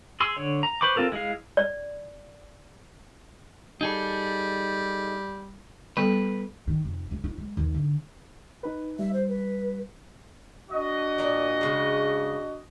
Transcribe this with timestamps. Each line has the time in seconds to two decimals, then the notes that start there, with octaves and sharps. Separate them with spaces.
0.20 G#4 C6 E6
0.37 D3 C#5
0.63 A#5
0.81 B4 C5 B5 C#6 D6
0.96 C4 F4 A4 A#4
1.12 G#3 E4 G#4 F5
1.57 D5
3.81 G3 D#4 G#4 A4
5.97 G3 B3 A4 B4
6.67 D#3
6.85 F1
7.11 C#2
7.24 E4
7.37 G#3
7.57 D#2
7.74 D3
8.63 D#4 B4
8.99 G3 E5
9.13 C5
9.28 B4
10.69 D4 F#4 D#5
11.18 A#2 A#4 D5
11.61 C#3 G#3